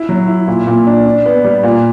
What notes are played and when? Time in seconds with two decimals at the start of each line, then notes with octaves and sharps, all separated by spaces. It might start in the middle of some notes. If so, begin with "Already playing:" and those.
Already playing: E4
0.09 F#3
0.28 E4
0.47 A#2
0.67 A#2
0.87 D4
1.06 D4
1.26 B3
1.44 G3
1.63 A#2